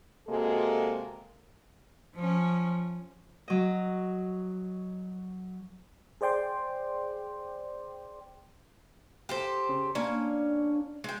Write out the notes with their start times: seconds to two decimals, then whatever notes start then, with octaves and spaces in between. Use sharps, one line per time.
0.28 C3 G#3 A#3 F#4 G#4 A4
2.15 F3 C#4
3.48 F#3 D#5
6.21 G#4 C5 D5 G5 C6 D6
9.29 G4 A4 C5
9.69 C#3
9.95 A#3 C#4 D4
11.04 G#3 G5